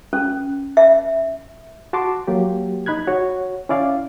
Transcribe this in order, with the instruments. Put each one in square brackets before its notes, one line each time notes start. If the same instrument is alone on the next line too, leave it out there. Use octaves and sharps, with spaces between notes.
[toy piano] C#4
E5
[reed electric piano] F#4 A5 C6 D6
F#3 A#3 G4
D#4 B5 F#6 G#6
F#4 C#5
C#4 E4 D5 F5